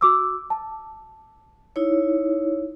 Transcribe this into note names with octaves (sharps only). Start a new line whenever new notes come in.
F#4 D6 E6
A5
D#4 E4 C#5